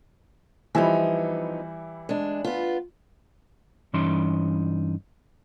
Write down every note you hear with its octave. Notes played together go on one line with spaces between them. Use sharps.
E3 F3 G3 B3 D#4 E4
G#3 D4
B3 F4
G2 E3 C#4 D#4 C6